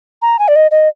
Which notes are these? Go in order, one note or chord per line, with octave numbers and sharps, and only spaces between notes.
A#5
G#5
D5
D#5
D#5